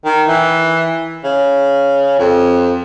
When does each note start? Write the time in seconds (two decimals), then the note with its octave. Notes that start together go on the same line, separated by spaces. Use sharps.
0.05 D#3
0.28 E3
1.24 C#3
2.19 F2